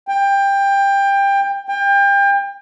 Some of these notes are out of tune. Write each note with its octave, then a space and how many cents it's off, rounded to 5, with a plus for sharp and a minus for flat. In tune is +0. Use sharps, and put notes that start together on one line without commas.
G5 +20
G5 +30